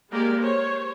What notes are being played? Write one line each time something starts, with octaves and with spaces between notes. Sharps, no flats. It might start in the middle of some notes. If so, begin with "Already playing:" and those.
G#3 A#3 G4 A#4 D5
C5 C#5